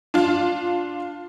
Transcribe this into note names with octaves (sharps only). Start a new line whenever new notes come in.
D4 F4